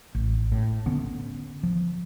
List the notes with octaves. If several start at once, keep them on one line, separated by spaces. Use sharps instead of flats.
A1
A2
D3 B3 C#4
F3